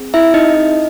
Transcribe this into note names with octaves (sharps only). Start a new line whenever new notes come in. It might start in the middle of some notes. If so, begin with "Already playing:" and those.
Already playing: C4 G#4
E4 E5
D#4 D#5